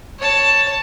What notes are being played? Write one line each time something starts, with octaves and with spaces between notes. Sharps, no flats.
C#5 A5